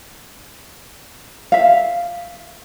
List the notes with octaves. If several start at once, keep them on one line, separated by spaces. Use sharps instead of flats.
E5 F5